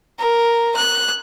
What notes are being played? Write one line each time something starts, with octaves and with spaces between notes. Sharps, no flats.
A#4
F#6